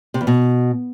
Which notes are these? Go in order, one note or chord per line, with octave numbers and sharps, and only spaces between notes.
C3
E2
B2